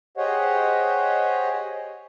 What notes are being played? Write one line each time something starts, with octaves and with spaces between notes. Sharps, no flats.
G4 G#4 C5 C#5 D#5 F#5